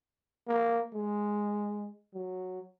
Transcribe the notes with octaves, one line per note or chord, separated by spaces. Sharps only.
A#3
G#3
F#3